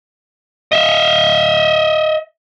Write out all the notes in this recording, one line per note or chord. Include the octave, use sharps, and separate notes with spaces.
D#5 E5